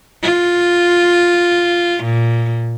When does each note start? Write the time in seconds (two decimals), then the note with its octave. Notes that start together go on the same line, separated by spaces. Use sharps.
0.22 F4
2.04 A#2